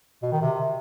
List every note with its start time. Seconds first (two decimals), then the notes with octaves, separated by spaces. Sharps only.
0.23 B2
0.32 D#3
0.42 C3